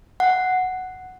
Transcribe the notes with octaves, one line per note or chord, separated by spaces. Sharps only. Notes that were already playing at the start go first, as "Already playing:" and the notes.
F#5